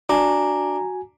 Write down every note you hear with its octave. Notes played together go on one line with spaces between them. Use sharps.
D4 F#4 G#5 A#5